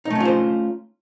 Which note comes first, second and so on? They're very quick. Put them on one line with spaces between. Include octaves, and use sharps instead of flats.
D#4 A3 C#4 F4 C5